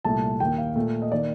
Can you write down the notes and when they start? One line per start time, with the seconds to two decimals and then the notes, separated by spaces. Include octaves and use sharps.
0.05 C2 A#2 A3 A5
0.40 D#2 D#3 A#3 G5
0.58 F5
0.76 A#2 A3
1.02 D#5
1.12 D#3 A#3 D5